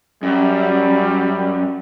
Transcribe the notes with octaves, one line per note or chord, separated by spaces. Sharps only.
F#2 G3